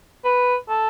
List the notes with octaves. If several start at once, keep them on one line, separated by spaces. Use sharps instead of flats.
B4
A4